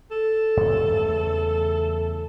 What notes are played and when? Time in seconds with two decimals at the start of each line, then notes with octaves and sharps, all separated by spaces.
0.11 A4
0.57 G2 F3 A3
0.87 E2 C#3 A3